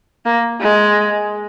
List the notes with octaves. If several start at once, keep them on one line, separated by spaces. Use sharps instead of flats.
A#3
G#3